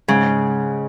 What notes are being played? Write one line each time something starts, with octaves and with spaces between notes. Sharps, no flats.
G#2 C#3